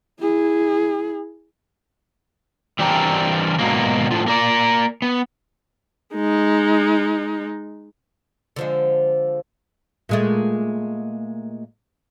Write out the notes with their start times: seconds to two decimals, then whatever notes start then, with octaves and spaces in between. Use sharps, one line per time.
0.19 E4 G#4
2.79 E3 G3 C4 D4 G4 A#4
3.59 G#2 B2 D#3 F#3 A#3
4.11 A2 F3
4.27 A#3 A#4 D5
5.02 B3
6.14 G#3 D#4
8.56 D3 F3 G#3
10.09 A#2 G#3 A3